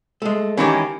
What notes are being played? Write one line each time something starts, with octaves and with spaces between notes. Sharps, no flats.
G#3 A3
D#3 E3 A#3 C#4 G4